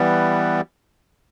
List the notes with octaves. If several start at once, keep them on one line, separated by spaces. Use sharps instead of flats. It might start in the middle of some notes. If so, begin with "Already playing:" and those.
Already playing: E3 G3 B3